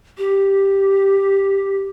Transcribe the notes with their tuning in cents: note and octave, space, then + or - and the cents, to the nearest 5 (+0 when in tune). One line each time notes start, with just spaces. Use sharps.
G4 +0